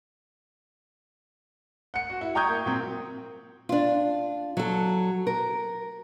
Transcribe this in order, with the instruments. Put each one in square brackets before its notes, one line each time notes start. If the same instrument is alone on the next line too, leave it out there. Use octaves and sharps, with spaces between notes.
[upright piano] F#5 C#7
F#4
E4
G5 A#5 C#6 D#6 G6 G#6
A#3
A#2 F#3 C4
[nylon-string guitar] D4 F4
F#3 A4
A#4